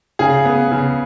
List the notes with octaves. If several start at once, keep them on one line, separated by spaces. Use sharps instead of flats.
C#3 G#4
B3
C#3